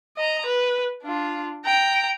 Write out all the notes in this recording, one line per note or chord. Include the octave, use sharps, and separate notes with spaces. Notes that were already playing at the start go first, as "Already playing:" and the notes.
D#5 A#5
B4
D4 F4
G5 A#5